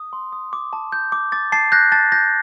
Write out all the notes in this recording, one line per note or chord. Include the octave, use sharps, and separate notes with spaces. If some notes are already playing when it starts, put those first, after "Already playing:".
Already playing: D#6
C6
D#6
D6
A5
G6
D6
D6 A6
A5 A6 C7
F#6 G6 A#6
A5 A6
G6 A#6